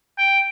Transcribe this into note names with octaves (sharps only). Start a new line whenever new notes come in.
G5